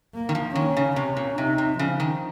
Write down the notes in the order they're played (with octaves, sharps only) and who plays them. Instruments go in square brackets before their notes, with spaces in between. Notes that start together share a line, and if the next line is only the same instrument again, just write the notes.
[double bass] A#3
[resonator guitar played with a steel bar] D#3
F3
[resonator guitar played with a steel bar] D#3 [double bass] C#4
[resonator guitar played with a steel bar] C#3
[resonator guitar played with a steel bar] C3 [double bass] C#4
[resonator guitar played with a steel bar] A#2
[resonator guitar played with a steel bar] C3 [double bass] D#4
[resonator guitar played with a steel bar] C3
[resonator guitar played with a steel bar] C#3 [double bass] F3
[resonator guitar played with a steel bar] D#3